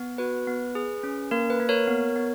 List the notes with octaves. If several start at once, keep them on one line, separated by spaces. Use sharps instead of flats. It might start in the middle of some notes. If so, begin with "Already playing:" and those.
Already playing: B3
F#4 B4
B3
G#4
C#4
A#3 A#4
B4
A#3
A#4 C#5
B3
B3